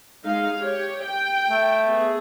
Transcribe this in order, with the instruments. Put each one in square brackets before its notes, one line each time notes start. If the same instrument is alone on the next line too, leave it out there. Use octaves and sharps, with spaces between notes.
[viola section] G#3 D#4 F5
G4 C#5
G5
[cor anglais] A3
[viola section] B3 G#4